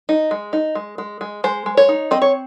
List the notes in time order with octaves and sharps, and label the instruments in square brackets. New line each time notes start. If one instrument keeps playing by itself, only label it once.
[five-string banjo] D#4
G#3
D#4
G#3
G#3
G#3
G#3 C5
G#3
C#5
D#4
C4 D#5
C#5